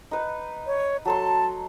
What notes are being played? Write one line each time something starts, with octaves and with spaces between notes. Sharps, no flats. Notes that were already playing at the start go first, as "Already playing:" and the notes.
D#4 B4
C#5
F#3 A4 A5 C6